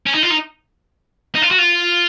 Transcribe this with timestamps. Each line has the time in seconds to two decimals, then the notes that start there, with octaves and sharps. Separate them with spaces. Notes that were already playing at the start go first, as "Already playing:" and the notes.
0.06 C#4
0.14 D#4
0.22 F4
0.30 D#4
1.35 D#4
1.42 F4
1.51 F#4
1.58 F4